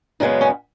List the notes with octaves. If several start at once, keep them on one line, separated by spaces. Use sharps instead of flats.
F#2 C#3 G#3 B3 D#4
C#4